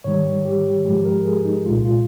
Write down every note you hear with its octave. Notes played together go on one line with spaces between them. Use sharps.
G#2 D#3 G3 C#5
G4
G#2 F3 G#3 G4
A#4
G#4
D#4
C2 A#2 G#3 F4
F4